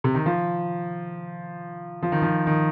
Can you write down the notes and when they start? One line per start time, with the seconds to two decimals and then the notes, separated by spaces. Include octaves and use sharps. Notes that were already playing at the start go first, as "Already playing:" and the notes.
0.04 C3
0.15 D#3
0.26 F3
2.02 F3
2.12 D#3
2.22 F3
2.47 D#3